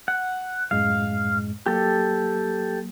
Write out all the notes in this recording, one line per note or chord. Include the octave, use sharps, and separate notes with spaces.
F#5
F#2 A2 G#3 F5
F#3 A#3 G4 A4